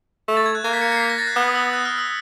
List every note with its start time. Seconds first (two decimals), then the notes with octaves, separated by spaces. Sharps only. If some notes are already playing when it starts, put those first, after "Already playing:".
0.28 A3
0.37 A6
0.46 G#6
0.55 F#6
0.64 A#3 G#6
0.73 B6
0.82 C#7
0.92 C#7
0.96 C7
1.00 B6
1.10 A#6
1.18 A6
1.27 F#6
1.36 B3 F6
1.47 D#6
1.55 E6
1.73 F#6
1.85 F6
1.98 E6